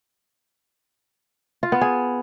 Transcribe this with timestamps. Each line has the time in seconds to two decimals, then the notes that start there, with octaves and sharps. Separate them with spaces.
1.63 F4
1.72 B3
1.81 G#4